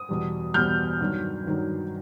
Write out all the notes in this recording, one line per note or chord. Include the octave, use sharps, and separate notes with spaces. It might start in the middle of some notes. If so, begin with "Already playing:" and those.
Already playing: D#6
E2 B2 G3
E2 B2 G3 F6 G6
G2 D#3 F#3
G2 D#3 F#3